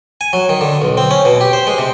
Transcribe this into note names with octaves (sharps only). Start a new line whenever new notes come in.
G#5
F#3
D#3
D3
B1
C4
C#4
B2
G4
C5
G#3
C3